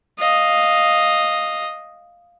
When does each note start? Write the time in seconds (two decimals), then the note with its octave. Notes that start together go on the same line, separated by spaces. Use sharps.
0.19 D#5 F5